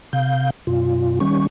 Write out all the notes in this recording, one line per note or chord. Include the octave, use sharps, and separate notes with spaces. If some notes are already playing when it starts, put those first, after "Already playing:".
C3 F5 G6
F#2 B2 F4
D#3 G3 C#4 C#6